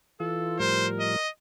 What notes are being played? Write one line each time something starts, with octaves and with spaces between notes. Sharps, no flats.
E3 F4 A4
A2 F3 G3 A#4 C5
D#5